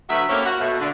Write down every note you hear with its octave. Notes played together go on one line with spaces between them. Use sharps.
D2 F#3 A3 F#4 B4 E5
A#3 C4 C#4 E4 G4 A4
F#4
B2 A3
D3